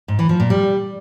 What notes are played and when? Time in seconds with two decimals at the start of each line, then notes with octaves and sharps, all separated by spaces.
0.08 G#2
0.19 E3
0.29 F3
0.40 A#2
0.50 G3